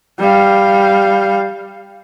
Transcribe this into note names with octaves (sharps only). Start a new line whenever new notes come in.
G3 F5